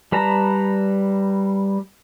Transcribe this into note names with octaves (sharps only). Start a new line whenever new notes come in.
G3 B4 A5 A#5